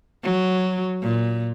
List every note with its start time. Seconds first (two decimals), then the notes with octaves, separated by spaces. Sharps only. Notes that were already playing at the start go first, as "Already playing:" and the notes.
0.23 F#3
1.02 A#2